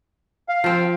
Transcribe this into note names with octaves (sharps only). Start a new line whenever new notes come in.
F5
F3 C4